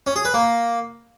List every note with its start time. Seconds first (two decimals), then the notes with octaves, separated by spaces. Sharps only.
0.07 C#4
0.16 G#4
0.25 B4
0.34 A#3